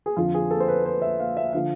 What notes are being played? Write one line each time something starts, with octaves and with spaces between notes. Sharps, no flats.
G#4
F2 D3 F3 F4
G#4
A4
C5
B4
C5
E5
F5
E5
D3 F3 F5